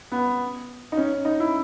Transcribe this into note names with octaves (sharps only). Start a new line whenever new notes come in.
B3
D#4
C#4
D#4
E4